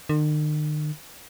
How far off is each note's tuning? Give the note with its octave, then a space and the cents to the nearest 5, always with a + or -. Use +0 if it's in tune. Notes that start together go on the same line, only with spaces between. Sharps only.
D#3 -45